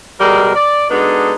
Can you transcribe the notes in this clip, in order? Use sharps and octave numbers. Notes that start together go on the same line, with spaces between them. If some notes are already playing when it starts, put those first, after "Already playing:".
B2 G3 G#3 A#4
D5
G#3 B3 D4 D#4 F#4 A4